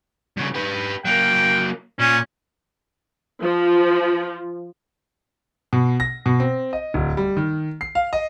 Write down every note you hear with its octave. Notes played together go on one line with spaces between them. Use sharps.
G2 C#3
G4 B4
F#3 A#3 G5
A#2 C#4
F3
B2
A#6
B2
C4
D#5
D1
G3
D#3
C7
F5
D#5